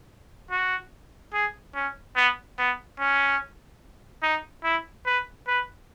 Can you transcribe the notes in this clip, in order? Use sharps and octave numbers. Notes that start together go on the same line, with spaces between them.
F#4
G#4
C#4
B3
B3
C#4
D#4
E4
B4
B4